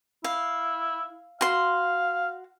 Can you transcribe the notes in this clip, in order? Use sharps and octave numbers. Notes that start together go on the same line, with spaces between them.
E4 F5
F#4 F5 C6